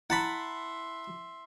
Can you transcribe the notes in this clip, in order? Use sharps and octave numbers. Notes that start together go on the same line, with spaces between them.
E4 E5 F#5 A5 B5 C6